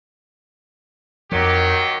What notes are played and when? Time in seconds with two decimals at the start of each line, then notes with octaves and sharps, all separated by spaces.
1.32 F2 D#3 F3 F#3 G4